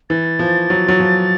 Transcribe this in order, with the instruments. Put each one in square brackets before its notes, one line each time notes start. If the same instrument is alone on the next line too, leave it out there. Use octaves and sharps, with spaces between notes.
[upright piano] E3 [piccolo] A6
[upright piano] F3
F#3
F#3
F3